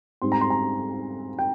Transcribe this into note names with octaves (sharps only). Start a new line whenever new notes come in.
G#2 G3 C4 C6
A#5
C6
A#5
G5